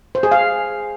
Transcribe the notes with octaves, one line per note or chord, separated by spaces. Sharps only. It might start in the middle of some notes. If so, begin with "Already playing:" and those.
C5
G#4
F5